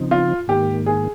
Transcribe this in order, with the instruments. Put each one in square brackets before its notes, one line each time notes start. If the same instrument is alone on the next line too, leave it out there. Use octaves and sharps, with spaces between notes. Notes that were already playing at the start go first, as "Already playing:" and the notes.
Already playing: [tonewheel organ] C#3 F3 C4 D#4
[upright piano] F4
[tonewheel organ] G#2 D#3 A#3 [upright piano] G4
[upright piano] G#4